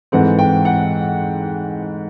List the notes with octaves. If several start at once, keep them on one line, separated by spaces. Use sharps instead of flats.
G#2 E3 A3 C4 F#5
G5
F#5